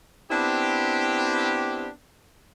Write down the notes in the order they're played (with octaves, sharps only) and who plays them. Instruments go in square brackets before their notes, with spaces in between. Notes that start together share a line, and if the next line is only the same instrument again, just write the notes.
[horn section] B3 C4 D4 E4 G4